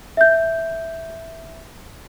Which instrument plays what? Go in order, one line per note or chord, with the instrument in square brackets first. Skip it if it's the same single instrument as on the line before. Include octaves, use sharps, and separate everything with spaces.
[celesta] E5 G6